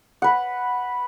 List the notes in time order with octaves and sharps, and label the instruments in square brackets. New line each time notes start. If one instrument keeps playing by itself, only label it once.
[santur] B4 F#5